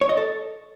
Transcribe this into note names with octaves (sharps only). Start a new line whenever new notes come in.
C#5
D#5
A4